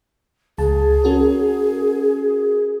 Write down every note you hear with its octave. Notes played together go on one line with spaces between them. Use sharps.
C#2 G#4 A5
C#4 F#4 A#4